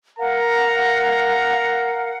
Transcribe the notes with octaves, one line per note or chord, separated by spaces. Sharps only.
A#4 F5 F#5 A#5